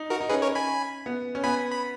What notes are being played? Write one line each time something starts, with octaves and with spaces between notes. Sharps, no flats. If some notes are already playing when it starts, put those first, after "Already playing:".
Already playing: D#4
F#4 A#4
D#4
C#4 G#4 B4
A#4 C#5
G#5 B5
B3
C#4
B3 G#5 B5
B5